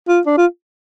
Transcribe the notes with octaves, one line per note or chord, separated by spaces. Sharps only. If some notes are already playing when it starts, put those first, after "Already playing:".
F4
D4
F4